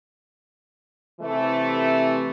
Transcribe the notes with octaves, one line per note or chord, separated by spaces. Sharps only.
C3 E3 A3